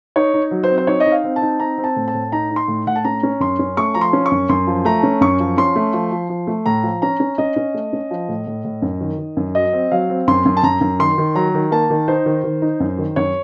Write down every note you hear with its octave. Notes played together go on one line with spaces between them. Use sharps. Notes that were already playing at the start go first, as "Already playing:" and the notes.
D#4 C#5
D#4
F#3
C5
C4
C5
D#4 C#5
D#5
D#4
F5
C4
A5
D#4
C4 A#5
C4
A5
A2
A5
A2
D#4 A#5
D#4
C6
A2
A2 F#5
A5
C#4 A#5
C#4
F#2 C6
C#4
A3 C#6
F3 A#5
C6
C#4
C#6
F#2
F#2 C6
F3
A3 A#5
C#4
F#2 C#6
F3
C#4 C6
A3
F3
F3
F3
A3
A2 A#5
F3
C#4 A#5
C#4
C#4 D#5
C#4
A3
C#4
F3
A2
A2
A2
F#2
D#3
D#3
F#2
F#3 D#5
C4
F#3 F5
C4
F#2 C6
F#2
A5
F#2 A#5
F#2
D#3 C6
D#3
F#3 A#5
D#3
A#3 A5
D#3
D#4 C5
D#3
D#3
D#4
F#2
D#3
F#2 C#5